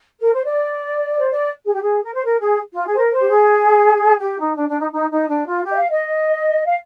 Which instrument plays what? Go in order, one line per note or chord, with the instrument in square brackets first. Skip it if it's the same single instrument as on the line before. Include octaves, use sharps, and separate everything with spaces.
[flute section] A#4
C5
D5
C5
D5
G#4
G4
G#4
A#4
C5
A#4
G#4
F4
G#4
C5
A#4
C5
G4
G#4
G4
D#4
D4
D4
D#4
D#4
D#4
D4
F4
G4
D#5
F5
D#5
F5